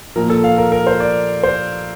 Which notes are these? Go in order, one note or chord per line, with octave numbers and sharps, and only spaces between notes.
A#2 F3 A#4
A4
F5
A#4
A#4
C5
D5
C5